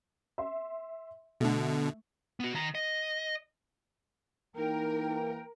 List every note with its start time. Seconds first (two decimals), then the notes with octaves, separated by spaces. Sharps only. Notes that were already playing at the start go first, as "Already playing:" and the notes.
0.38 E5 C6
1.41 B2 D3 A3
2.40 B3 F#4
2.54 D#3 A#5
2.75 D#5
4.56 E3 A#3 D#4 A#4 G5